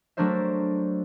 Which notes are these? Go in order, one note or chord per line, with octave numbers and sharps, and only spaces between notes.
F#3 A3 D4 A#4 C5 E5